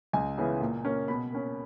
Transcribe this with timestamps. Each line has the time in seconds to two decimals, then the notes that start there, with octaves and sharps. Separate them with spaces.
0.13 C#2 G#5
0.38 C#3 E3 B3
0.61 A#2
0.85 A#3 C#4
1.08 B2 B5
1.32 A#3 C#4